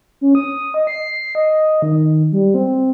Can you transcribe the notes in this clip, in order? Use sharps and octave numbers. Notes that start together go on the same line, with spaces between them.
C#4
D#6
D#5
C7
D#5
D#3
G3
C4